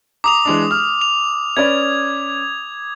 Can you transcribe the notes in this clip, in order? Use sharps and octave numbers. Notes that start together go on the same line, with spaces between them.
A#5 D6 D#6 F7
E3 G#3 D4
F6
F7
C#4 B4 D5 G#6